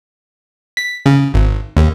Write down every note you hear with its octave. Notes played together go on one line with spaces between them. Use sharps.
B6
C#3
G#1
D#2